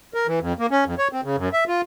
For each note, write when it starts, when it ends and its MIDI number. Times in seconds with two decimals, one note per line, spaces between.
0.14 0.27 70
0.27 0.39 52
0.41 0.53 41
0.59 0.67 58
0.71 0.84 61
0.86 0.95 41
0.98 1.08 73
1.13 1.21 60
1.24 1.36 49
1.37 1.49 42
1.53 1.64 76
1.68 1.81 65